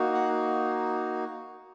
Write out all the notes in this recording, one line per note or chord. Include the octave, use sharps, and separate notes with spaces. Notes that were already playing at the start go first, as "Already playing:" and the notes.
Already playing: A#3 D#4 F#4
F#5